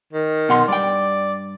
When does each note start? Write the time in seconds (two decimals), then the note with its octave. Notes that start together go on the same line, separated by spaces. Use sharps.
0.13 D#3
0.49 B2 F#5 C6
0.68 G2 D5 G5